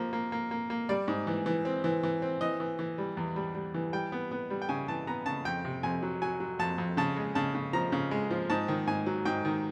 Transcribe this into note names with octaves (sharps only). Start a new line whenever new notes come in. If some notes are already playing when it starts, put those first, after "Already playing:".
Already playing: F3 A#3
A#3
A#3
A#3
A#3
G3 D5
G#2
E3
E3
C4
E3
E3
C4
E3 D#5
E3
E3
G3
E2
G3
G3
E3
G3 G5
B3
B3
G3
G5
C#3 G#5
E3 A5
B3 A#5
C#3 A5
F2 G5
C3
F2 G#5
F#3
F#3 G#5
F#3
F2 A5
F2
C#3 A5
G#3
C#3 A5
C#3
F3 A#5
C#3
G#3
F3
G#2 A5
D#3
G#2 G#5
F#3
G#2 G5
D#3